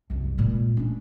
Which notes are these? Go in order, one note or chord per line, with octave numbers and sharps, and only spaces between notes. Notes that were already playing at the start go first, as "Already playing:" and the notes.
C2 F#2
A#2 G#3
C#4 D4